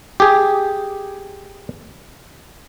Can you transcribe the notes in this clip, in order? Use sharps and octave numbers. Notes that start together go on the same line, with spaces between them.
G4 G#4